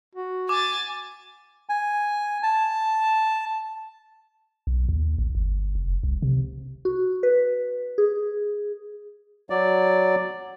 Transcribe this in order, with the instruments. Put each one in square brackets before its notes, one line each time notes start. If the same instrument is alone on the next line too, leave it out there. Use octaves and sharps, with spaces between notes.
[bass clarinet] F#4
[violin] G#5 A6 [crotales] D6
[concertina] G#5
A5
[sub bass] B1
D#2
A1
G1
F1
C2
C3
[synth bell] F#4
B4
G#4
[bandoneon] F#3 D5